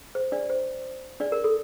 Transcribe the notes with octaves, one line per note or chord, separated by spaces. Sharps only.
C5
D4 D5
C5
D4 D5
A#4
A4